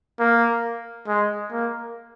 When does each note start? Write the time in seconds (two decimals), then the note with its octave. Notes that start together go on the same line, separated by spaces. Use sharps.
0.19 A#3
1.07 G#3
1.52 A#3